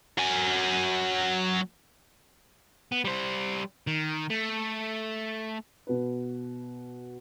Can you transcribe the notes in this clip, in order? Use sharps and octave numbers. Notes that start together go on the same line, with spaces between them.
F#3 G#5
B3
G3 C5
D#3
A3
B2 B4